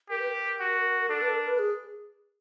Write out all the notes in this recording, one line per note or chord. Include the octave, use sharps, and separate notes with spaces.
G4 A#4
B4
A#4
F#4
D4 A4
B4
A4
A#4
B4
G#4